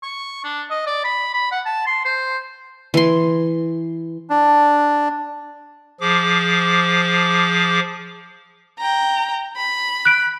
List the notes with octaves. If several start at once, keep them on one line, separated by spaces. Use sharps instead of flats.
C#6
D4
D#5
D5
B5
B5
F#5
A5
C6
C5
E3 C6
D4
F3 G#4 D6
G5 A#5
B5
F#6 D7